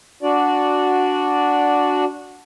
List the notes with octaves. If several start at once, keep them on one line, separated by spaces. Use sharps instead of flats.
D4 F#4 D5